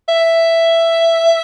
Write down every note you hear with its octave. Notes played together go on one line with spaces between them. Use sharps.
E5